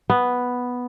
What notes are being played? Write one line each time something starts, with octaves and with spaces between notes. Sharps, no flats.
B3